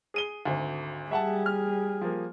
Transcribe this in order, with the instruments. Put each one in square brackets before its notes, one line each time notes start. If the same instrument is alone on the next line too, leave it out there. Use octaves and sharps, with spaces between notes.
[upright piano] G#4 D#7 G7
G#1 D2
[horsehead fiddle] G3 G#4 [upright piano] E5 F#5 A5
[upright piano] F6
F3 A#3